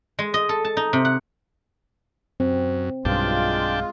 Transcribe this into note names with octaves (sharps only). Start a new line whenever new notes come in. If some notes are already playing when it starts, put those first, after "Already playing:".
G#3
D#5
A4
A5
D#4
C3
F#5
F#2 C4
B1 G2 G#3 D4 F4 G5 A5